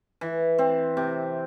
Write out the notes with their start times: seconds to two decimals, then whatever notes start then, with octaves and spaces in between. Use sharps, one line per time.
0.21 E3
0.58 C4
0.97 C3